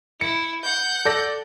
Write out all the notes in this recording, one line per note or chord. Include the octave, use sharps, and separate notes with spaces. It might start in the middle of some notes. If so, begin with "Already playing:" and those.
E4 C#7
F#5 G6
A4 D5 A#6